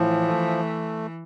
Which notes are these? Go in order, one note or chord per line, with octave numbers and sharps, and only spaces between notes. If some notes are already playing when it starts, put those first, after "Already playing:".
Already playing: A2 E3 F3
A3